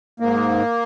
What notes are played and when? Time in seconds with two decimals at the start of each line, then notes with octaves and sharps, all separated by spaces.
0.20 G#2 A#3